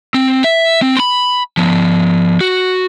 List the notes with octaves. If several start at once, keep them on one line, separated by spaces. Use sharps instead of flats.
C4
E5
C4
B5 C6
F3 B3
F#4